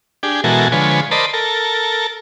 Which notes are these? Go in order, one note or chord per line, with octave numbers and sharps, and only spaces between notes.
D4 G4 G#4
B2 E3 G#3 F#4 A4 A#4
D3 F3 G#3 B4 C#5
A#4 C5 D5 D#5 A5 B5
A4 A#4